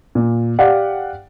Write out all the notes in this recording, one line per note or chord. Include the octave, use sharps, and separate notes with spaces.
A#2
G4 D5 F5 F#5